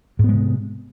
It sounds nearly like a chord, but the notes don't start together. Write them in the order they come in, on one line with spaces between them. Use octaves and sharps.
G#2 B3 G#3 C3